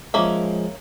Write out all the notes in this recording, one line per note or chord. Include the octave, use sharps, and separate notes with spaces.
F3 G#3 A#3 C#4 G#4 E5